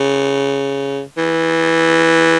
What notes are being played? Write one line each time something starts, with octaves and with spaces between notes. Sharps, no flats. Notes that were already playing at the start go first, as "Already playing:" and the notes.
Already playing: C#3
E3